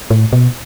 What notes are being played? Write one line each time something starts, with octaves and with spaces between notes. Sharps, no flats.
A2
B2